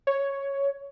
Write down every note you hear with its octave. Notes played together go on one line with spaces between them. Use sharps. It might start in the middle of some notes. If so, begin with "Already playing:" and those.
C#5